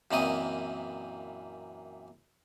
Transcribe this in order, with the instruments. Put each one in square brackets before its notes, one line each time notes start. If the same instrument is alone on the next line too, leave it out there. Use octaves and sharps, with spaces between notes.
[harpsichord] F#2 A#2 E3 C4 D#5 D#6